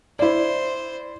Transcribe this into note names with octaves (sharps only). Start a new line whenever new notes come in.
E4 C5 D5